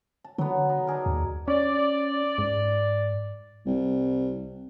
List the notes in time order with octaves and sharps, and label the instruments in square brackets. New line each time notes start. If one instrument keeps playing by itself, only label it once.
[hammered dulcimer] A5
[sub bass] D3 [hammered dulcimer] F#3 B3
[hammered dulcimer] D#4
D4 G#4 A#4
[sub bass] D#2
[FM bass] C#4 [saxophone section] D5
[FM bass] G#2
[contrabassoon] C2